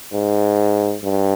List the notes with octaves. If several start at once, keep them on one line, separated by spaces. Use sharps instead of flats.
G#2
G2